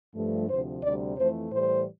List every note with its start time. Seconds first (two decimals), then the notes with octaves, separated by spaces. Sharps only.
0.14 G2 F3 A3
0.48 D2 C3 F3 C5
0.82 D2 C3 G3 D5
1.17 F2 E3 A3 C5
1.51 A2 E3 G3 C5